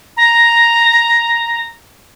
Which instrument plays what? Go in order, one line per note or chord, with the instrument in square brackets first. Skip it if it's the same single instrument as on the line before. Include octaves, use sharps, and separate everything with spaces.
[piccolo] A#5